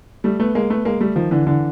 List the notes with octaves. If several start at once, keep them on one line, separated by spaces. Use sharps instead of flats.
G3 A3
A3 B3
G#3 A#3
A3 B3
G#3 A#3
G3 A3
D#3 F3
D3 E3
D3 E3